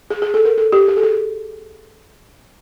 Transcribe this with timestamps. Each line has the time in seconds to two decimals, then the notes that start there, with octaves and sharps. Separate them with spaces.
0.10 G#4
0.22 G#4
0.34 A4
0.45 A#4
0.58 A4
0.72 G4
0.88 G#4
0.97 A4
1.03 G#4